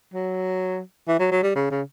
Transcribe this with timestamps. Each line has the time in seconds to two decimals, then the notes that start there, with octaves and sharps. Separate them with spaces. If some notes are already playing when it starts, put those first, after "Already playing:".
0.14 F#3
1.08 E3
1.19 F#3
1.32 F#3
1.43 G3
1.55 C#3
1.71 C#3